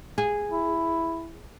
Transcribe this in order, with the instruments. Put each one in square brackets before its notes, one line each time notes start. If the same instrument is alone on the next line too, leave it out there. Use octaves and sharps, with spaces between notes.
[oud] G#4
[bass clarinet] E4